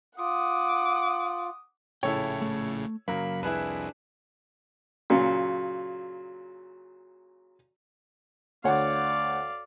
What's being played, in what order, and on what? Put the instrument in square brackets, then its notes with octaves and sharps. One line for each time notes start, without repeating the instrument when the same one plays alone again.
[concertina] F4 [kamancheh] F#5 D6 [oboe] D#6
[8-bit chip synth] A#1 A2 C#3 [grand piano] E4 A4 C#5 [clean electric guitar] G5
[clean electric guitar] A3
[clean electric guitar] F#2 C#3 [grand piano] F#3 A#3 [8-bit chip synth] B5
[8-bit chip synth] C2 F2 [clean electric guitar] D4 [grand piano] E4 G#4 B4
[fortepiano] A#2 C#3 F#3
[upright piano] D2 C#5 F#5 [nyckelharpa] D5 F5